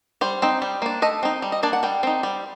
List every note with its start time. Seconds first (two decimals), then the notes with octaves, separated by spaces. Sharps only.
0.21 G3 C5
0.42 C4 D#4
0.62 G3
0.82 A#3 D4
1.02 A3 D#5
1.23 C4 D#4
1.42 G3
1.52 D#5
1.63 A#3 D4 D5
1.73 F#5
1.83 G3 G5
2.03 C4 D#4
2.23 G3